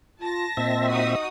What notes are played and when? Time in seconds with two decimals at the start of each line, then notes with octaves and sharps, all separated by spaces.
0.20 F4 A5 A#6
0.57 A#2 C4 D#5 E5
0.88 D#4 F#4 D#6